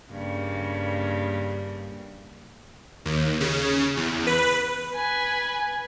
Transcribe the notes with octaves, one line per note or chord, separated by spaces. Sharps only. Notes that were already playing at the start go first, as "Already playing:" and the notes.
G2 C#3 A#3
D#2
C#3
E2
B4
B4 G#5